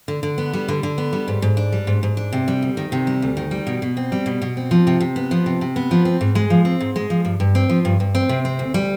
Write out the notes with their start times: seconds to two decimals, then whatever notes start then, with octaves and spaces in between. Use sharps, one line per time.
0.08 D3
0.23 D3
0.38 B3
0.53 G3
0.68 D3
0.83 D3
0.98 B3
1.13 G3
1.28 G#2
1.42 G#2
1.57 D4
1.72 G3
1.87 G#2
2.03 G#2
2.17 D4
2.33 C3
2.48 G3
2.62 D2
2.77 D#3
2.92 C3
3.07 G3
3.22 D2
3.37 D#3
3.51 G3
3.67 B2
3.82 B2
3.97 C4
4.12 G3
4.26 B2
4.42 B2
4.57 C4
4.71 F3
4.87 C3
5.00 C3
5.16 B3
5.31 F3
5.46 C3
5.61 C3
5.76 B3
5.91 F3
6.05 C4
6.21 G#2
6.35 G#3
6.50 F3
6.65 C4
6.80 G#2
6.96 G#3
7.10 F3
7.25 G2
7.40 G2
7.55 C4
7.69 F3
7.85 G2
8.00 G2
8.15 C4
8.29 C3
8.45 C4
8.59 D2
8.74 G3